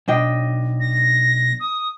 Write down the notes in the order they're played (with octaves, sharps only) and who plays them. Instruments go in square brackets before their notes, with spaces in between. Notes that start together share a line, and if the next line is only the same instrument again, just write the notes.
[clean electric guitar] B1 [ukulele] D4 D#5 G5
[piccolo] A#6
D#6